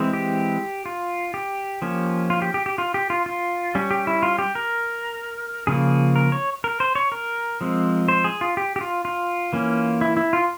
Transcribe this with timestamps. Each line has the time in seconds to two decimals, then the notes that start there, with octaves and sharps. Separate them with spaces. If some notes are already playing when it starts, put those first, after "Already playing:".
Already playing: E3 G#3 C4
0.13 G4
0.86 F4
1.34 G4
1.82 F3 A#3 C#4
2.30 F4
2.42 G4
2.54 G4
2.66 G4
2.78 F4
2.94 G4
3.10 F4
3.26 F4
3.75 G3 C#4
3.91 G4
4.07 E4
4.23 F4
4.39 G4
4.55 A#4
5.67 C#3 F3 A#3 G#4
6.16 A#4
6.32 C#5
6.64 A#4
6.80 C5
6.95 C#5
7.12 A#4
7.61 F3 G#3 C4
8.08 C5
8.24 G#4
8.41 F4
8.57 G4
8.76 G4
8.81 F4
9.05 F4
9.53 E3 A#3 C#4
10.01 E4
10.17 E4
10.33 F4